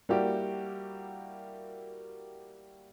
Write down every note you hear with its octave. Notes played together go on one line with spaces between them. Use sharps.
G3 A#3 E4 F#4 G4